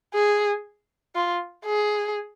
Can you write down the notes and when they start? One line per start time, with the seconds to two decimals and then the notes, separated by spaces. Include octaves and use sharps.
0.14 G#4
1.15 F4
1.66 G#4